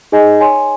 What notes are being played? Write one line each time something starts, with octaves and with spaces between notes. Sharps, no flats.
D#4 G#4 D#5 G#5
C#5 G#5 C6